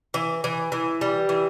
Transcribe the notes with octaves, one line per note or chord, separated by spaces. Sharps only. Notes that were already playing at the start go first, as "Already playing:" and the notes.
E3
E3
E3
G3
E3